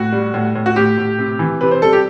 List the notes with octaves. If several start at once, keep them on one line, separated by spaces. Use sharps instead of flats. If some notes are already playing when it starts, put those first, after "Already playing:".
Already playing: A2 F#4
G3
A2
A2
F#4
A2 G4
A2
C3
E3
C3 B4
C5
G3 A4
G4